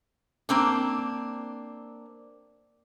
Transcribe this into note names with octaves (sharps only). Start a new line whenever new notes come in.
A#3 C4 D4